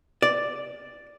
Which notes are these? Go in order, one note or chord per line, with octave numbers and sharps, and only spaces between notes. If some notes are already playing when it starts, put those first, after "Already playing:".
D5